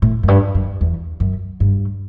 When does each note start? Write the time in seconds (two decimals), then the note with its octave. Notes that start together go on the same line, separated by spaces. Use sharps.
0.02 A2
0.23 F#2
0.28 G2
0.55 F#2
0.81 E2
1.20 F#2
1.60 G2